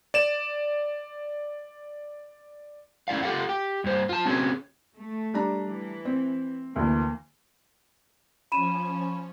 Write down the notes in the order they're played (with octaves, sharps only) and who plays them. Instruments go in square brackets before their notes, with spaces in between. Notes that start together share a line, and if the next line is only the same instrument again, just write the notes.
[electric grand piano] D5 E7
[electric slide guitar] C#4 E4 D5 F5
F4 G4 A4 F5 F#5
G4
G2 C5
F4 A5
C4 C#4 F#4 G#4 C#5
[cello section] A3
[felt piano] G3 D4 A#5
[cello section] E3
[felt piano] C4
[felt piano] D2 E3 [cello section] A#3
[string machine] F3 C#4 [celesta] B5 D#7 E7